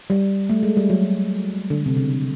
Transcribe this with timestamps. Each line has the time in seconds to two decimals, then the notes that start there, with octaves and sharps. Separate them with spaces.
0.10 G3
0.50 A3
0.63 G#3
0.77 G3
0.90 F#3
1.70 D3
1.86 C3
1.97 C#3